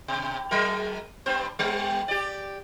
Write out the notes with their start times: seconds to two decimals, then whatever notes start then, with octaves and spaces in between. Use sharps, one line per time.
0.08 B2
0.51 F#3 G#3 A#4
1.26 G2 B3 C5
1.59 G3 B3
2.08 G4 D5